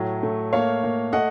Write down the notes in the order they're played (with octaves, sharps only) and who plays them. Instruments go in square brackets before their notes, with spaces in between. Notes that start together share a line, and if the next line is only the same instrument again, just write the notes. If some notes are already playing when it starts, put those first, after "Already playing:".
Already playing: [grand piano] A2 F#3
A3
A#3 C#5 F5
A#3
A3 D#5 F#5